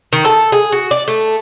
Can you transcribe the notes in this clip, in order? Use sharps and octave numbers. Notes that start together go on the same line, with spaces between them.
D#3
A4
G#4
F#4
D5
A3